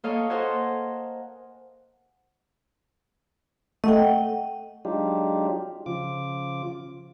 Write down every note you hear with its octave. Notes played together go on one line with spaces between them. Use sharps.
A#3 A4 C#5 D#5 F5
A4 A#4 C5 D#5 F#5 G#5
A3 D#5 F#5 G5
F#3 G#3 D4 D#4 F4 G4
C#3 F3 F4 D6